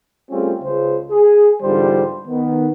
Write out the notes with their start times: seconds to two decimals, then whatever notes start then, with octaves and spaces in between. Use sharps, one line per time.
0.31 G3 A3 C4 C#4 F4 G#4
0.62 C#2 C#3 C5
1.11 G#4
1.62 E2 G#2 D3 G3 F4 C5
2.28 D#3 B3